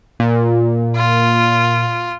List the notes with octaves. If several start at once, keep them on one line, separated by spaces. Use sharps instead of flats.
A#2
F4